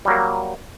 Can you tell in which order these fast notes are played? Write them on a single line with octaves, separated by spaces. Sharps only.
G3 F#3 A#3